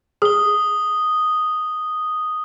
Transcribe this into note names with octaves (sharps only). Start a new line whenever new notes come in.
G#4 D#6 G7